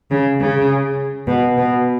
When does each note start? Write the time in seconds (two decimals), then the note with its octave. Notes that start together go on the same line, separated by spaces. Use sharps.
0.11 C#3
0.40 C#3
1.27 B2
1.57 B2